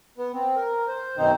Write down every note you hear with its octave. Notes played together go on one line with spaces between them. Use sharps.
B3
C4
A#4
C5
F#2 B2 D#3 C4 D#4 C5